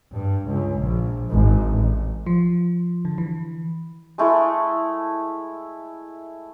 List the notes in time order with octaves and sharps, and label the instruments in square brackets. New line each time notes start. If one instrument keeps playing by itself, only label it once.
[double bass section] G2
C#2
A#1
G#1
A1
[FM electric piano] F3
D3
E3
[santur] G#3 A3 E4 A4